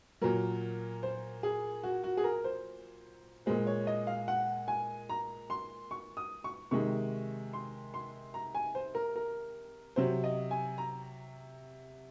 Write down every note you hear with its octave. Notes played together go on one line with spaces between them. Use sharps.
A#2 F#3 A#4
C5
G#4
F#4
F#4
G#4
A#4
C5
A#2 G#3 C5
C#5
D#5
F5
F#5
G#5
A#5
C6
C#6
D#6
C#6
C3 D#3 G#3 C#6
C6
C6
A#5
G#5
C5
A#4
A#4
C3 F#3 C5
D#5
G#5
A#5